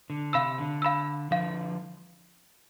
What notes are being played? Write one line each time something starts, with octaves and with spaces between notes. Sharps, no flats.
D3
C3 F5 B5 E6
D3
F5 B5 E6
D3 F3 F5